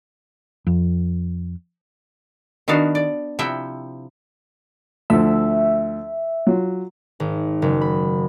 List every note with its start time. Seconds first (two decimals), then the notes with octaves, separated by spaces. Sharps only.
0.67 F2
2.68 D#3 B3 D4 F#4 F5
2.95 D5
3.39 C3 F3 E4 E5 F#5 G5
5.10 D2 F3 E5 E6
6.47 F#3 F4
7.20 G#1
7.62 F#1
7.81 B5